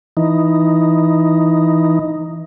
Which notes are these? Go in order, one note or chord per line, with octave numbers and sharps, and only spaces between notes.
E3 D#4